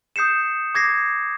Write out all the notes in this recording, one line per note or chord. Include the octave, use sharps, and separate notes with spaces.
D#6 G6 C7 C#7 E7
D6 G#6 A#6 C7